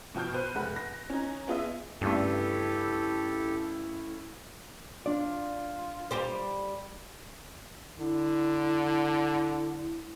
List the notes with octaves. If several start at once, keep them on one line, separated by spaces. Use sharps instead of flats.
B2 F3 G5 F6 G6
B4 C5 F#6
F1 G#3 F#5 B5
A#6
C#4 D#4
B3 F4 G#4 D#5 E5
G2 C#3 A3 E4 G4 A4
D4 F4 D5
G3 G4 C5
D3 E4